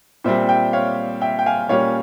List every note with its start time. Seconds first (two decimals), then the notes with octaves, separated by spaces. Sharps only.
0.24 A#2 G3 C4 C5 E5
0.49 E5 G5
0.73 C#5 F5
1.22 E5 G5
1.39 G5
1.46 F5 G#5
1.69 A#2 G3 A#3 C#4 C#5 F5